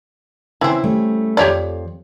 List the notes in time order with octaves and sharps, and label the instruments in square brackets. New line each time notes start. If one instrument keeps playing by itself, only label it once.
[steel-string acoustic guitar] C#3 E4 [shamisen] E3 C4
[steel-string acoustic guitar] G3 A3 C#4
[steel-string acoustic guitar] F2 F5 [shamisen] G4 C#5 D5